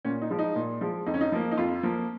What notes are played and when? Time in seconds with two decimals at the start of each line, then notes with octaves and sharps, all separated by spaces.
0.05 A#2 C#4
0.22 D#4
0.30 F3 G#3
0.39 D#4
0.56 A#2
0.81 F3 G#3
1.06 F2 D#4
1.14 C#4
1.21 D#4
1.32 F3 A#3
1.51 D#4
1.57 F2 F4
1.83 F3 A#3